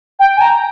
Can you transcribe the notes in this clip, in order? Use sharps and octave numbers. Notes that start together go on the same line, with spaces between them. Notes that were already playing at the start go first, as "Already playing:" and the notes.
G5
G#5
A#5